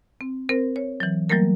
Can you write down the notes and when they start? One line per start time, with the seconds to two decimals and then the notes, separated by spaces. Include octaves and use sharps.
0.21 C4
0.49 C4 A#4 C5
0.76 C#5
1.00 E3 F#3
1.29 E3 F#3 G3 A3 A#3 A#4